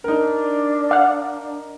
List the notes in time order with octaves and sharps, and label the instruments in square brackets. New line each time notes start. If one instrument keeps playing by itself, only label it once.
[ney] D4 [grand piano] D#4 A#4
[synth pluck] F5 F#5